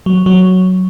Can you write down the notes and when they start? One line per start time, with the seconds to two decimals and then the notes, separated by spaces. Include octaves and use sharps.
0.06 F#3
0.26 F#3